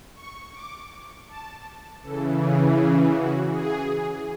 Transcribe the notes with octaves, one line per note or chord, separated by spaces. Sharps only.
C#6
D6
A5
C#3 E3 A4
G#4
G#4
F#4
G#4